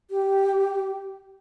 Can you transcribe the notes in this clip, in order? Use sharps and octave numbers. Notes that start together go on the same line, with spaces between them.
G4